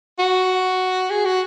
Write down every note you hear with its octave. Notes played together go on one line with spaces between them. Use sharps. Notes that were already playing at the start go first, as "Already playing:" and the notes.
F#4
G#4
F#4